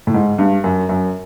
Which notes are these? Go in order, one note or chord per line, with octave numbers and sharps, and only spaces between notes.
A2
G#2
G2
F#2
F#2